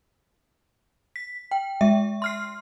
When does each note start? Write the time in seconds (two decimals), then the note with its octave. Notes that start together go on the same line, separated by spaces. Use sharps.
1.16 B6
1.51 G5
1.81 G#3 E5
2.22 C6 F6 C7